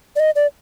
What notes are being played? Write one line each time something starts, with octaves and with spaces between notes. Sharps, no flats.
D5
D#5
D5